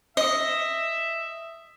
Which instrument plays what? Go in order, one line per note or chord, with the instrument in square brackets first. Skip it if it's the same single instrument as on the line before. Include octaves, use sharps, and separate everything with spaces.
[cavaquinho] D#5 [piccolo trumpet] E5